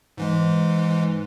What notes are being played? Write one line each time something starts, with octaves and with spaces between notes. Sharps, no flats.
G#2 E3 G#3